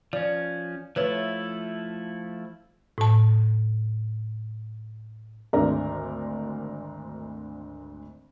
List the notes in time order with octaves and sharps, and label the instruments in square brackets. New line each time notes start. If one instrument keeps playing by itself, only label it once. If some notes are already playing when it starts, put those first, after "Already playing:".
[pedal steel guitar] F3 C#4 [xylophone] D5
[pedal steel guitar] F3 A3 E4 [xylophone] B4 C#5
[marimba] A2 A5
[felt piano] G#1 D2 D3 A#4 D5 A#5